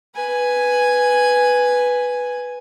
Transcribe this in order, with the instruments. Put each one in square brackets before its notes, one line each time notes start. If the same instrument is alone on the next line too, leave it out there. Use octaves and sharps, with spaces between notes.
[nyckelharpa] B4 G#5